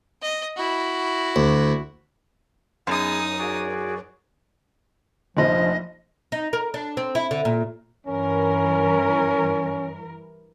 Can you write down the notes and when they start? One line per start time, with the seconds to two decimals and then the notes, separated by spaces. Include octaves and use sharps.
0.22 D#5
0.56 E4 F#4
1.36 D2
2.87 F#2 B3 D#4 G#4 D#6
3.39 F#4 G#4 D5
5.37 F1 A#1 F3 D#5
6.32 D#4
6.53 A#4
6.74 D4
6.97 C4
7.15 E4
7.31 D3
7.45 A#2
8.07 G2 E3 C#4 A#4